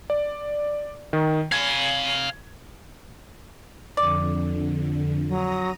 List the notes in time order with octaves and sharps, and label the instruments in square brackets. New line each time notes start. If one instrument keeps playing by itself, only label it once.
[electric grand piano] D5
D#3
[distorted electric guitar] F5 G#5 [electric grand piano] G#6
[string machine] F2 D3 [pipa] D5
[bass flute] F#3 [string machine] A#5 D#6 A#6